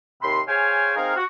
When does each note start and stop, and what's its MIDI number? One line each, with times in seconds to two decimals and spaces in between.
0.22 0.41 39
0.22 0.41 48
0.22 0.41 83
0.22 0.41 84
0.48 0.95 68
0.48 0.95 72
0.48 0.95 73
0.48 0.95 77
0.48 0.95 79
0.48 0.95 80
0.96 1.15 60
0.96 1.15 63
0.96 1.15 68
0.96 1.15 70
0.96 1.15 77
1.16 1.24 66